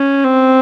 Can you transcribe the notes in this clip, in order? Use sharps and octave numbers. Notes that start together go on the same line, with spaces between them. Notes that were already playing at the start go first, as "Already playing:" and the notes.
Already playing: C#4
C4